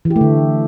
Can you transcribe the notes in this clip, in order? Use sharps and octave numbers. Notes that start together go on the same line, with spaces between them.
E3
G4
A3
D3